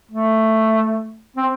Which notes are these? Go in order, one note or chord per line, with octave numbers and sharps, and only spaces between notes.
A3
C4